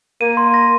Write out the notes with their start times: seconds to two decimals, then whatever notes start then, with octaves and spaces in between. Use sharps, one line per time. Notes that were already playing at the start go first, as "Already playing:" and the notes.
0.21 A#3 D#7
0.37 C6
0.54 A#6